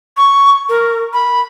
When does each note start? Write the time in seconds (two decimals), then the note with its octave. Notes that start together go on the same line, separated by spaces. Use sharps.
0.17 C#6
0.69 A#4
1.13 B5